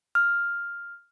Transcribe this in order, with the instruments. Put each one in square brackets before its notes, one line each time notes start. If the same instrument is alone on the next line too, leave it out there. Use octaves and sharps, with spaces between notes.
[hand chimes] F6